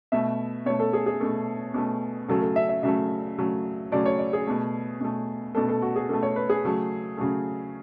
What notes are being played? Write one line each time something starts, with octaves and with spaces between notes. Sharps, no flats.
B2 A3 E5
B2 A3 C#5
A4
G#4
G#4
B2 A3 A4
B2 A3
C#3 F#3 A3 A4
A4
E5
E5
C#3 F#3 A3 E5
C#3 F#3 A3
C#3 F#3 A3 D5
C#5
D5
G#4
B2 A3
B2 A3
B2 A3 A4
A4
F#4
G#4
B2 A3 A4
C#5
B4
G#4
C#3 F#3 A3
C#3 F#3 A3